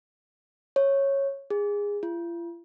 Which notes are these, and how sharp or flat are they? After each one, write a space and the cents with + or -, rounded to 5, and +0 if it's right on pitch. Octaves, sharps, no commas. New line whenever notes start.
C#5 -10
G#4 -20
F4 -45